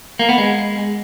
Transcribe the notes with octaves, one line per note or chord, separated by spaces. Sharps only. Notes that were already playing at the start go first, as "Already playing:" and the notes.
A#3
B3
G#3